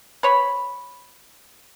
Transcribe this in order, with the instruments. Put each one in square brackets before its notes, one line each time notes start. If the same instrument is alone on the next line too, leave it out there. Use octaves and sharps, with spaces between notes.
[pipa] B4 C#5 B5